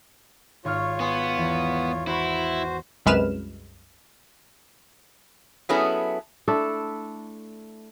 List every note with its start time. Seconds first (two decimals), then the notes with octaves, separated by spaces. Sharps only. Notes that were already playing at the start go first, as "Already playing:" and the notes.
0.65 G#1 F4 C#5 C#6 F6
1.00 B3 G#5 C6 C#7
1.37 E2
2.07 E4 F#4 C5 F#5 B5 C#6
3.06 C2 F#2 G#3 B4 F6 E7
5.69 F#3 B3 C#4 E4 G#4 A4
6.48 A3 D4 E4 A4